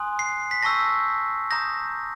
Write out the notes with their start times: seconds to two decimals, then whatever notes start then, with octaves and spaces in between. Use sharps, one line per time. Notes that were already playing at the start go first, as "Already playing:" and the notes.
Already playing: G#5 C6 D#6 F#6
0.19 C7
0.51 B6
0.62 A5 C#6 E6 G6 A#6
1.51 A#5 D#6 G6 A#6